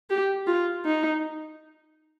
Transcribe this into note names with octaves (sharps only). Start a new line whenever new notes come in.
G4
F4
D#4